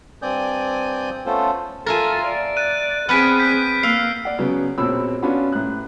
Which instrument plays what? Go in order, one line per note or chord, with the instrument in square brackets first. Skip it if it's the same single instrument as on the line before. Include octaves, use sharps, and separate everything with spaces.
[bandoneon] G2 C4 D5 G#5 D#6 G6
A3 B3 C#4 F4 A4 C5
[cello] F4 A4 [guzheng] A#4 E5 G#5 [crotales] A6
[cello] D5
[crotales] F#6 D#7
[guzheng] B3 B4 G#5 [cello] C4 G#4 [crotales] F6 B6 D7
[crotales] G6 B6
[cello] A#3 [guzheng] F5 [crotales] E6 C7
[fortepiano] D5 F#5
C#3 F#3 B3
A#1 B2 C4 C#5 B5 E6
B3 C#4 D4 F4 F#4 B5
A1 F#6